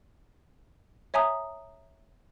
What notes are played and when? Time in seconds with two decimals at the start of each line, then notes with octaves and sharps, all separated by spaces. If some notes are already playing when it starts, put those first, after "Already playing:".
1.14 C#5 E5 G#5 A#5 D#6